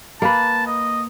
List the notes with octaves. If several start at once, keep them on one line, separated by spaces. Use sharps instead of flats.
A#3 B4 A5
D#5